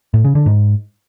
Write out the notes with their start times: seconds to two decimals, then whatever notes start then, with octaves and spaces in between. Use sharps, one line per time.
0.14 A2
0.24 C#3
0.35 D3
0.46 G#2